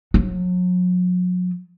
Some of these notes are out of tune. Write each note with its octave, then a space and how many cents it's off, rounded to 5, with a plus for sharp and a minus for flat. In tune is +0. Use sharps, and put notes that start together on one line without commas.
F#3 -40